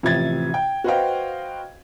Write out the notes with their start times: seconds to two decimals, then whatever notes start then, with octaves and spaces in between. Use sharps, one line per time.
0.03 A1 C3 F3 E5 G#6 A6
0.54 G5
0.84 F#4 B4 C5 D#5 F5 G5